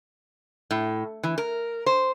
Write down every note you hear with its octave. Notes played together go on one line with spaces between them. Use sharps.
A2
E3
A#4
C5